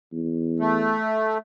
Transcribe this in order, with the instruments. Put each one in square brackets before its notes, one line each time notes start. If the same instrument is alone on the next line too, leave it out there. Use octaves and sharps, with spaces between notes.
[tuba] E2
[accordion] A3